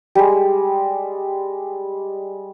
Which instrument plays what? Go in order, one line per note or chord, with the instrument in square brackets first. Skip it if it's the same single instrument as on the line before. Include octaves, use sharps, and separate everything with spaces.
[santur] G3 G#3